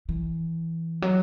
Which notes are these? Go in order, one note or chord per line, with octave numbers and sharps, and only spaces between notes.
E3
F#3